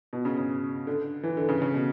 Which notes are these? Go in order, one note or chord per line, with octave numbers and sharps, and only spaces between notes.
B2
C#3
C#3
D3
E3
D3
C#3
C#3
B2